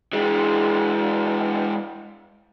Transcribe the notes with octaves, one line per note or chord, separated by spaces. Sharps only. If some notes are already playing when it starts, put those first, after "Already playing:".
E3 G#3